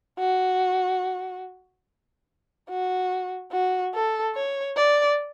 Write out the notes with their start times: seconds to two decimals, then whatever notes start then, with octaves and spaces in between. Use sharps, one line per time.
0.19 F#4
2.70 F#4
3.52 F#4
3.94 A4
4.35 C#5
4.77 D5